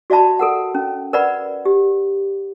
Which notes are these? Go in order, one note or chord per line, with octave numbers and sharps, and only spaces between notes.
F#4 D5 E5 A5 B5
A4 A#4 F#5
C#4
A#4 B4 D5 F#5 B5
G4